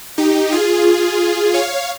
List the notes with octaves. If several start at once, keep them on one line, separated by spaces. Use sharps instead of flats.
D#4 G4
F4 G#4
C#5 F5